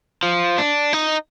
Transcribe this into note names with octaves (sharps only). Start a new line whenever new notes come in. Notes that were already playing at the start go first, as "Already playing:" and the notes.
F3
D4
D#4